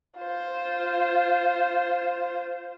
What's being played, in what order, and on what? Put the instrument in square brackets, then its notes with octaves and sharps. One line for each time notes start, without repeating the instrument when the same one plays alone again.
[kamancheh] F4 C5